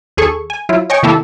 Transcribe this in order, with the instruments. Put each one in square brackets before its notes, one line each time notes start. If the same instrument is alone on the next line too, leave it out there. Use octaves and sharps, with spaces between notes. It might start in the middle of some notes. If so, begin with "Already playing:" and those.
[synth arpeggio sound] D#2 G#4 A4 C#6
G#5
F#3 E4 F4
C#5 D#5 G5 G#5 C#6
C3 D#3 A#3 E4 G4 A4